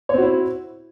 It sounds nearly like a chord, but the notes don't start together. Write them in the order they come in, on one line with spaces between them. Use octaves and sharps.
C#5 C4 F#4 E4